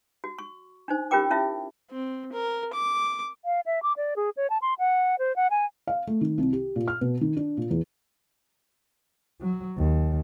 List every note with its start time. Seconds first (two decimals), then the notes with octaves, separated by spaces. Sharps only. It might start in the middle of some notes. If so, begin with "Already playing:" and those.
0.24 F#4
0.39 C#6
0.88 D4 D#4 C5
1.11 C#4 F4 G4 A#4 G5 D6
1.31 C#4 E4 F4 E5
1.91 C4
2.33 A#4
2.73 D6
3.45 F5
3.66 E5
3.83 D6
3.97 D5
4.16 G#4
4.37 C#5
4.50 A5
4.62 C6
4.79 F#5
5.19 C5
5.36 F#5
5.50 G#5
5.87 F5
6.07 A3
6.21 D#3
6.38 C2
6.53 G4
6.76 A#2
6.88 F6
7.01 B2
7.21 D#3
7.37 D4
7.57 A#2
7.71 E2
9.41 F#3
9.77 D#2